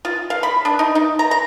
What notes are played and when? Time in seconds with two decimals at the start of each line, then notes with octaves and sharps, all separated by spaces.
0.05 F4
0.30 F5
0.43 B5
0.65 D4
0.79 D#4
0.95 D#4
1.19 A#5
1.31 A#5